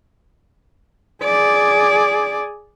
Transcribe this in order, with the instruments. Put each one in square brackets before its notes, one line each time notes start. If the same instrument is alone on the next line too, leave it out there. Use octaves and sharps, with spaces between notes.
[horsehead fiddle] G#4 D5